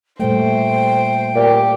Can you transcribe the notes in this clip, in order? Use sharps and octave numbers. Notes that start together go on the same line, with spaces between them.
A#2 G3 A3 C5 G5
A#2 G4